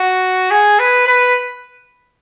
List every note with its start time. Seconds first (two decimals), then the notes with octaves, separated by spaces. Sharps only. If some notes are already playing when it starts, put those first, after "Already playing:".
Already playing: F#4
0.51 G#4
0.79 B4
1.07 B4